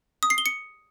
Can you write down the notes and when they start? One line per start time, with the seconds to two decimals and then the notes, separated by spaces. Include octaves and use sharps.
0.23 D#6
0.30 C7
0.38 G7
0.46 C#7